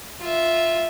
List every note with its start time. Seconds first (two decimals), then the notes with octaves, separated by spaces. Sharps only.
0.21 F4 E5